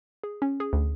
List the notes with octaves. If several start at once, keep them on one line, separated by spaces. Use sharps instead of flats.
G#4
C#4
G#4
D2